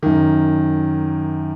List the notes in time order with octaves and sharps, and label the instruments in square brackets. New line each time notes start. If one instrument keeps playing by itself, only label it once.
[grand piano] F#2 D#3